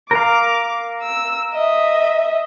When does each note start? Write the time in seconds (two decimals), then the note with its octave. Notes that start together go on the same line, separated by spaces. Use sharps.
0.11 A#4 F5 D6
1.02 E6
1.53 D#5 E5